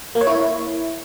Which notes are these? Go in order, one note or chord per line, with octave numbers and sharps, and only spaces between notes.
A#3
C#5
E4